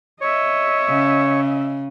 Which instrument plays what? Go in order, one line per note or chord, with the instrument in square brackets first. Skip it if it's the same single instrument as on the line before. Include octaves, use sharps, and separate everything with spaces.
[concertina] C#5 [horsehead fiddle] D#5 E5
[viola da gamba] C#3